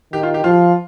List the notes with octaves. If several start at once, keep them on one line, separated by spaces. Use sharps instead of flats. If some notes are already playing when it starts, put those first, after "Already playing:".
D#3 G4
F4
G4
F3 F4